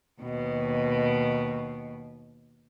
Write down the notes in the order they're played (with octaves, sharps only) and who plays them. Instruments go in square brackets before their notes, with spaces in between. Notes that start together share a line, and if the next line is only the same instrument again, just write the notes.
[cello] D#2 B2